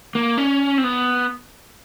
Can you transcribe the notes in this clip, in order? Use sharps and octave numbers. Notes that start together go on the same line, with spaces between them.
A#3
C#4
C4
B3